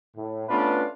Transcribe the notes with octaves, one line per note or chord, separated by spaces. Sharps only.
A2
A3 B3 C#4 D4 F4 B4